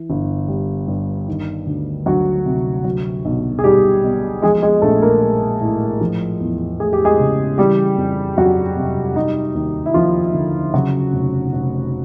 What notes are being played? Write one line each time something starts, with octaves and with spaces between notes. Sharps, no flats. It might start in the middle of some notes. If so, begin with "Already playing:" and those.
Already playing: E3
G1
G3
G2
D#3
D2
D2 F#3 F#4
C3
F#3
B1
G#4
B1 G3 G4
B2
F3 G#3 G#4
G#3 G#4
A#1 A3 A4
A#3 A#4
G#3
A2
F3
E2
A3 G#4
G4
G#3 G#4
C#3
E3 G3 G4
F2
F2 F#3 F#4
C3
G3 D#4
D#2
E4
D#2 F3 F4
D3
C#3 F#3 F#4
F1
F1